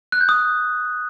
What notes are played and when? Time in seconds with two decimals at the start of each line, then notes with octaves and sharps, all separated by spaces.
0.12 F#6
0.21 G6
0.29 D#6